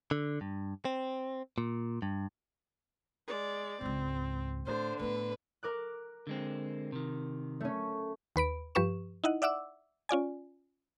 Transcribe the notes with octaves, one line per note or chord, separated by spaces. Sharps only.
D3
G2
C4
A#2
G2
G#3 D5
C#2 G#2 C4
A2 D3 C5
A2 B3 B4
A#4 D6 F#6
D3 G#3 C4
C3 D#3
A3 C#4
D#2 B4 B5 D7
G2 F3 G4 B4 C#6 E7
D#4 E4 D#5 F#5
D5 E5 F#5 D6 E6
C#4 F4 D5 G#5